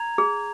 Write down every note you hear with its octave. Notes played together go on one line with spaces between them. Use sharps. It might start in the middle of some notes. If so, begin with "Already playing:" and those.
Already playing: A#5 G#6 F7
G#4